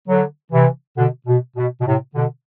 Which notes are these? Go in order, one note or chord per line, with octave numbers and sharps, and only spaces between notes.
D3 F#3
C3 E3
B2 D3
B2
B2
B2
A2 C3
B2 D3